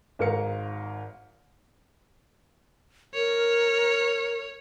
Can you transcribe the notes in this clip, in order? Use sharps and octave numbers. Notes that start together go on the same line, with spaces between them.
G#1 G#2 A#4 F5 C#7
A#4 C#5